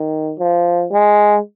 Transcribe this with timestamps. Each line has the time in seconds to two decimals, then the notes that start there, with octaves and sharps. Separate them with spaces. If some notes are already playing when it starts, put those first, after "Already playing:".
Already playing: D#3
0.39 F3
0.91 G#3